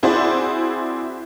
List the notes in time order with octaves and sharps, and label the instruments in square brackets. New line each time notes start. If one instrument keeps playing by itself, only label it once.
[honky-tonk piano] C4 E4 F#4 G#4 C5 D5